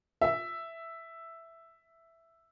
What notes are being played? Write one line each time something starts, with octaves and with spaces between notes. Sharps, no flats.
E5